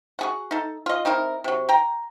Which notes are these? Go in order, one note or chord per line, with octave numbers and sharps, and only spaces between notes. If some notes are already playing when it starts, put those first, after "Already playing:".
F#4 G#4 F#5
D#4 A4
F4 D#5
C4 D#4 E4 A#4
C3 F#3
G5 A#5